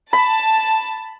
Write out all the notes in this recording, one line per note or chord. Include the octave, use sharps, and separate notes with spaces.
A5 B5